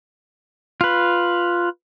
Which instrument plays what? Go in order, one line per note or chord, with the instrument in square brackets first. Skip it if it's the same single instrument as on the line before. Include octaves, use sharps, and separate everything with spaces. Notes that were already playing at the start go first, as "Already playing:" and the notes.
[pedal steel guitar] F4 B4